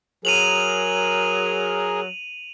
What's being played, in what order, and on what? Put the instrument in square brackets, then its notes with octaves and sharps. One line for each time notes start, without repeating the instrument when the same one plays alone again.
[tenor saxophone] F#3 [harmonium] G#4 A#4 [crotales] D#7 F7 F#7